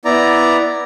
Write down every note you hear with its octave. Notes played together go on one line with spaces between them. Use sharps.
B3 E4 D5 A#5